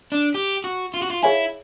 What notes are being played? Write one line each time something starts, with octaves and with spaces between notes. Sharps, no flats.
D4
G4
F#4
F4
F#4
F4
E4 G#4 C#5 F5 G#5